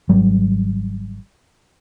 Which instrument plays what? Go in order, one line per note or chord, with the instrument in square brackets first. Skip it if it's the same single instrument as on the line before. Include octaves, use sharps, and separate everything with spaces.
[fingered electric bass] G#1 F#3 G3